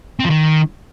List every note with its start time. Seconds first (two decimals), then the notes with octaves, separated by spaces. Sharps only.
0.20 C4
0.25 F3
0.30 D#3